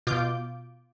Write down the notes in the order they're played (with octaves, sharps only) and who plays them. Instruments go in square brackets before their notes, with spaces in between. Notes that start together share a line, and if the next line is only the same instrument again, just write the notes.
[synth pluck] B2 F4 D6 G6